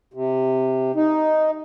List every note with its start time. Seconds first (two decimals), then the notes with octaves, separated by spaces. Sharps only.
0.14 C3
0.95 D#4